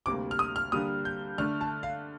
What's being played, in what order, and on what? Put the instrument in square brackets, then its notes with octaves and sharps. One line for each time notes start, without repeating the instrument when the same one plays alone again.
[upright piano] D2 C3 G3 A#3 [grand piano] D6
[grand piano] F6
D#6
F6
[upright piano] D3 G3 A#3 [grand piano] D#6
[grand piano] G6
[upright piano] D3 A3 D4 [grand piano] F6
[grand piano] A5
F5